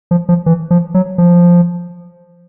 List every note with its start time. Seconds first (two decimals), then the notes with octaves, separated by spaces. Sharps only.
0.11 F3
0.29 F3
0.46 E3
0.71 F3
0.94 F#3
1.18 F3